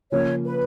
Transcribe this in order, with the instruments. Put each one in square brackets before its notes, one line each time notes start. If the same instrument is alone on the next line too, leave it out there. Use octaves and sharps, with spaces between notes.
[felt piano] C#3 F3 A#3 C#4 [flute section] C#5
[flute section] B4